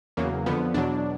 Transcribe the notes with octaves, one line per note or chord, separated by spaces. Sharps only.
E2 C#3 F#3 A#3
F2 D3 F3 B3
E2 B2 F#3 D4